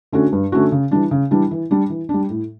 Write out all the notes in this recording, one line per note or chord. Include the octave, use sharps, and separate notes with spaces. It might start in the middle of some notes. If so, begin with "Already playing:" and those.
D3 A3 C#4 F#4
G2
D3 A3 C#4 F#4
C#3
E3 G3 D4
C#3
E3 G3 D4
E3
G3 D4
E3
G3 D4
A2